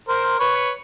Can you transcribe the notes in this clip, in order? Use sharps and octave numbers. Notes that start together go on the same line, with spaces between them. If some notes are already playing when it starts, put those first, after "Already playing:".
A#4 C5
B4 C#5